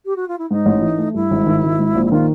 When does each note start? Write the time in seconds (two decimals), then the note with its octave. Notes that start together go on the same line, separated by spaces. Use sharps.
0.05 G4
0.16 F#4
0.28 F4
0.38 E4
0.50 G#2 D#4
0.66 A1
0.82 E3
0.98 A3
1.14 G2 E4
1.31 G#1
1.46 D#3
1.63 G#1
1.79 G#2
1.95 A#1
2.06 E4
2.12 D#3 F4